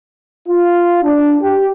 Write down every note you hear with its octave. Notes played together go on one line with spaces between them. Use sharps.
F4
D4
G4